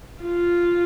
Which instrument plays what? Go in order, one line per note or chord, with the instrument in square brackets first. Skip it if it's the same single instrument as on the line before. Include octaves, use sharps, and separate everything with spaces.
[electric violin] F4